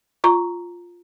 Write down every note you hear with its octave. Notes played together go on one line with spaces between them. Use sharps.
F4 A#5 C#6